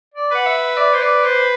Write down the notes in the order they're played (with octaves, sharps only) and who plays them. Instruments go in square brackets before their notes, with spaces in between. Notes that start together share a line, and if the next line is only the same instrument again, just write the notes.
[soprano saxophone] D5
[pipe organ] B4 [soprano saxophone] F#5
[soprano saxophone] E5
D5
C5
D5
C5